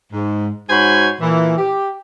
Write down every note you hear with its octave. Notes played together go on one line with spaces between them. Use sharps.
G#2
G#2 F#4 C5 C#5 G#5 B5
A#2 E3
G4